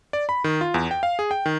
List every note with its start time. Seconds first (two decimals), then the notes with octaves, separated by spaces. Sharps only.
0.13 D5
0.29 B5
0.44 D#3
0.61 F4
0.74 E2
0.91 G5
1.03 F5
1.19 G#4
1.31 G5
1.46 D#3